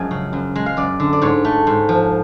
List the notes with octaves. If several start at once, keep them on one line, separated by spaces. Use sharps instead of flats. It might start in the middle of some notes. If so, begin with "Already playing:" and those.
Already playing: F#2 F3 G#3 G#5
C#3
F#2
G#3
F5
F#2 D5
D3
D5
G#2 C#5
A3
G#2
F3